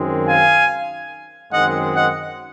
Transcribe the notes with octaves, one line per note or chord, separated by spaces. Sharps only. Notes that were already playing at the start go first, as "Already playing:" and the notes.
Already playing: F#2 D#3 G#3 C4
F5 G#5
F#2 D#3 G#3 C4 D#5 F#5
D#5 F#5